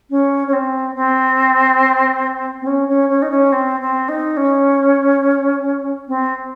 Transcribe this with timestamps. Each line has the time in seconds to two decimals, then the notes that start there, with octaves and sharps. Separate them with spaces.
0.10 C#4
0.47 C#4
0.53 C4
0.95 C4
2.62 C4
2.67 C#4
2.88 C#4
3.09 C#4
3.22 D#4
3.30 C#4
3.52 C4
3.80 C4
4.09 D#4
4.37 C#4
6.08 C4